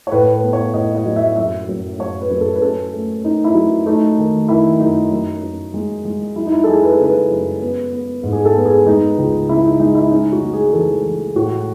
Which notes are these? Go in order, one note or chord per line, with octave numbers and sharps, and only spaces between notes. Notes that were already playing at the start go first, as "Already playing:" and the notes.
C#5
A2 B4
B4
B3
C#5
A2 D#5
D#5
F#3
E5
F#2 E5
F#2
F#2 C#5
B4
F#2
A4
B4
C#4 A4
A3
C#4 D#4
E4
F#3
A3 D#4
D#3
D#3 E4
F#2 D#4
F#2
F#2
G#3
G#3
F#3 E4
D#4
E4
A4
F#3 G#4
B4
A4
C#3 B4
F#2
B3
B3
G#2
G#4
A4
B3
G#4
G#3 D#4
C#2
C#3 E4
D#4
G#3 D#4
E4
C#4 D#4
F#4
G#3
G#4
G#4
E3 A4
E3
A2 F#4